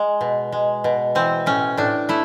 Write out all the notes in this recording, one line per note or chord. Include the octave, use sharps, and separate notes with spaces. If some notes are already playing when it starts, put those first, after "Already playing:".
Already playing: G#3
B2
G#3
B2
E3 C4
A2 C#4
A2 D4
A3 E4